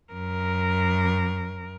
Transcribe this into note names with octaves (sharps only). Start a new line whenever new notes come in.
F#2 A#4